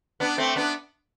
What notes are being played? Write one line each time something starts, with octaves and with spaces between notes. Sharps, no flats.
B3 D4
A3 C4
B3 D4